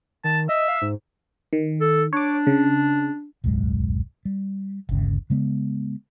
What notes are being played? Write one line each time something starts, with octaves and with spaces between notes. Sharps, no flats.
D#3 A5
D#5 E5
F5
G#2
D#3
A4
D4 C#5 D6
C#3
D1 B1 F#2 G#3
G3
G1 D#2 C#3
C#3 G#3 B3